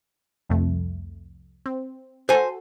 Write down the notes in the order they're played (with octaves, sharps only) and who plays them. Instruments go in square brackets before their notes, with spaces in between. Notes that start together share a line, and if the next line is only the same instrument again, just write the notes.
[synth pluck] C2 F2 A3
C4
[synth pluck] F#4 A4 [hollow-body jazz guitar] C5 G#5